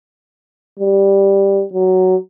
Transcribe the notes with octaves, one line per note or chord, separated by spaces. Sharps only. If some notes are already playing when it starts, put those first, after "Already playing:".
G3
F#3